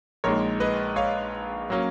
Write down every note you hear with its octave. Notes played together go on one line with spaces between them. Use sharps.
A#1 A#2 G#3 D#4 A#4 C#5
B4 D#5
C#5 F5
F#3 A#3 C#4